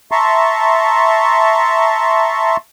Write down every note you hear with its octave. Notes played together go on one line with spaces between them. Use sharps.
E5 A5 A#5 C6 C#6